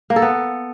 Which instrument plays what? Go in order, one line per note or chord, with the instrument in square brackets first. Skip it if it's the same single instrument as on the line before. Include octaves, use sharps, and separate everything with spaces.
[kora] A#3
A4
B3